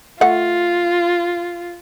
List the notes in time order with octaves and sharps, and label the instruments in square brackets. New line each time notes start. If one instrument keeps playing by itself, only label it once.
[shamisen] A3 F#5 [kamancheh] F4